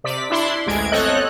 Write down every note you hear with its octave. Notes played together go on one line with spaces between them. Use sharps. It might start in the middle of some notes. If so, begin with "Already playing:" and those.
C3 D5 B6
D4 E4 C6
A1 D2 G#3 G#6 D7
G1 C4 A4 C#5 D#5 F#6